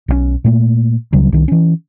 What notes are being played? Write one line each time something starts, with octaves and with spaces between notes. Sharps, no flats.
B1 E3 C#4
A#2 A3 A#3
C#2 C#3 F#3 G3
C2 D#3
E3 C#4